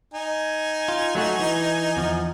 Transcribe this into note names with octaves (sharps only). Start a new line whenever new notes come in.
D#4 G#5
F4
F#3 A3 F#4
E3
E2 F3